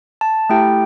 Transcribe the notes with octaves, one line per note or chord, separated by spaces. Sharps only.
A5
A3 E4 G4 G5